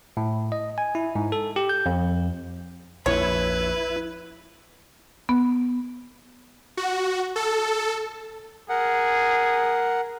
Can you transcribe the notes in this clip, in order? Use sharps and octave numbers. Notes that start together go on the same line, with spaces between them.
A2
D#5
G#5
E4
G#2
A4
G4
G6
F2
A#1 F2 E4 B4 C#5
B3
F#4
A4
G#4 A#4 F#5